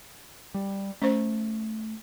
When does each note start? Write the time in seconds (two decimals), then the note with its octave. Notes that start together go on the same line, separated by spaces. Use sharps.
0.54 G3
1.02 A3 C#4 C5